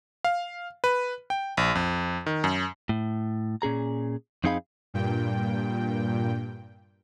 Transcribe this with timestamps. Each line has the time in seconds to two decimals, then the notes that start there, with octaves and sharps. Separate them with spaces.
0.24 F5
0.84 B4
1.30 G5
1.57 A#1
1.75 F2
2.26 D#3
2.44 F#2
2.89 A2
3.62 A#2 C#4 G#4 A#5
4.44 F2 C4 D#4 G#4 F5 B5
4.94 G2 A#2 G5